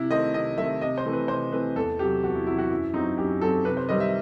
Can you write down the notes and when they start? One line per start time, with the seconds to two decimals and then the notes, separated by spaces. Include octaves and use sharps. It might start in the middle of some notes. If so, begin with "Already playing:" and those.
Already playing: C3 E4
0.10 D#3 A3 C4 D#5
0.34 C3 D#5
0.57 D#3 A3 C4 E5
0.81 C3 D#5
0.98 C5
1.05 E3 A3 C4
1.13 B4
1.28 C3 C5
1.52 E3 A3 C4 B4
1.76 E2 A4
1.99 C3 F#3 G4
2.23 E2 F#4
2.35 E4
2.47 C3 F#3 E4
2.58 F#4
2.70 F#2 E4
2.94 F#3 C4 D#4
3.18 F#2 G4
3.41 F#3 C4 A4
3.65 C3 B4
3.77 C5
3.89 D#3 G3 C4 D#5
4.00 E5